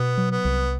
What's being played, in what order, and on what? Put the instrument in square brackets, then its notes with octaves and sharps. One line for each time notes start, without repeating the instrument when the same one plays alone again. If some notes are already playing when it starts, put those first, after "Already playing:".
Already playing: [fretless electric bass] B2 [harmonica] B3
[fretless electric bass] F#3
[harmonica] B3
[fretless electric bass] C2